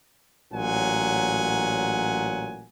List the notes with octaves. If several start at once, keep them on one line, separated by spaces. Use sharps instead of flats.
A1 A#2 F#3 F#5 G#5